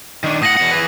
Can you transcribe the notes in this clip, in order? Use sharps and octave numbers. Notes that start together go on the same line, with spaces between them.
D#3 D4
A2 F#5 D#6 A#6 F#7
E2 B2 F#5
E3 G#4 B4